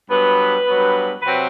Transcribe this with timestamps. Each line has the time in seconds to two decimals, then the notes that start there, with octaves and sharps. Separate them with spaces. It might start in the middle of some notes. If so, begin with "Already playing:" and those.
0.10 G2 F#3 B3 B4
0.67 G2 F#3 B3
1.22 C3 F#3 C4 B4